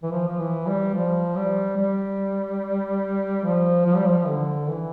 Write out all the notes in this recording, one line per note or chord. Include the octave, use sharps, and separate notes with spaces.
E3
F3
F3
E3
G3
F3
G3
G3
F3
F3
G3
F3
D3
E3